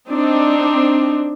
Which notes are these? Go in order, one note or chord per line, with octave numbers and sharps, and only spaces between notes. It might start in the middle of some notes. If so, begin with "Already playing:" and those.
C4 D4 D#4